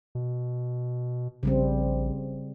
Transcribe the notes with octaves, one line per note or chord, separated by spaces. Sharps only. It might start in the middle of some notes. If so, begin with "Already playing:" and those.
B2
A#1 C#3 G3 C4